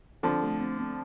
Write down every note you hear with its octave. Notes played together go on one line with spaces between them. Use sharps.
D3 F3 C4
A3
C4
C4